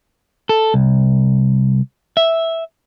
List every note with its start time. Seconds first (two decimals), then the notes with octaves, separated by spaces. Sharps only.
0.49 A4
0.74 C2
2.17 E5